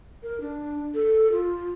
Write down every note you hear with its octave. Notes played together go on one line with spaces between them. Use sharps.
A#4
D4
A4
F4